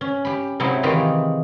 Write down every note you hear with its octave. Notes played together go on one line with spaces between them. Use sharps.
C#4
G4 B5
C3 F#3 G#3 D#4 E4
D#3 E3 G#3 F4 G4